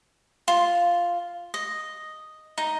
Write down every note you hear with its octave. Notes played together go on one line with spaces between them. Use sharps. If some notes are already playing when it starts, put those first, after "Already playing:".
F4
D#5
D#4